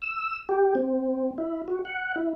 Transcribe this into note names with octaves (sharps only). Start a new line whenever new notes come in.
E6
G4
C4
E4
F#4
F#5
E4